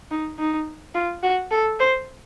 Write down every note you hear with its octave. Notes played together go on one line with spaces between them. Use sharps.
D#4
D#4
F4
F#4
A4
C5